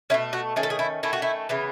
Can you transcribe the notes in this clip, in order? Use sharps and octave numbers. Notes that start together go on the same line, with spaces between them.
B2 A3 C#4 E4
F#4
D#3 A3 C#4 G#4
A4
G#4
E4
D#3 A3 C#4 E4
F#4
E4
C#3 E3 B3